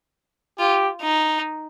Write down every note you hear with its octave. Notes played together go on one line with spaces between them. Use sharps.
F4 G4
D#4